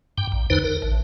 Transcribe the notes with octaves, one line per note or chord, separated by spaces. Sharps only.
G2 G5
A#1
E2 D3 D#4 B4 C5
A#4
A1